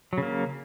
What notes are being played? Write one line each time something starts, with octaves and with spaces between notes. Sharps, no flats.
C#3 F#3 A#3